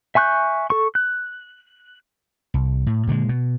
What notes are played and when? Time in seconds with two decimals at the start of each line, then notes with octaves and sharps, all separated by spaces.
0.15 E5 G#5 C#6 F#6 G6
0.70 A4 C#6
0.95 F#6
2.54 C2
2.87 A2
3.07 A#2 D3 F3 G#3
3.29 B2